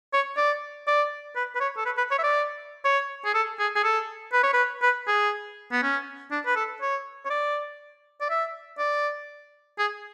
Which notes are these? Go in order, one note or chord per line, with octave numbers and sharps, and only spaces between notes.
C#5
D5
D5
B4
B4
C#5
A4
B4
B4
C#5
E5
D5
C#5
G#4
A4
G#4
G#4
A4
B4
C#5
B4
B4
G#4
B3
C#4
D4
B4
A4
C#5
C#5
D5
D5
E5
D5
G#4